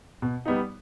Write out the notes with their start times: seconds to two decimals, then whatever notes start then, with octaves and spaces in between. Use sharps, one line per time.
0.22 B2
0.46 G3 B3 D#4